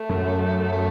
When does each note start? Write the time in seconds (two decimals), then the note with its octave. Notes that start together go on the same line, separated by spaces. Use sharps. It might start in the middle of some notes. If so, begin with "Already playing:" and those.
Already playing: A3
0.10 F#2
0.72 A3